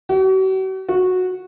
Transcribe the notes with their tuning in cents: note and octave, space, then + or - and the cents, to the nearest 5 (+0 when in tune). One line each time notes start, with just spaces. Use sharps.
F#4 +45
F#4 -10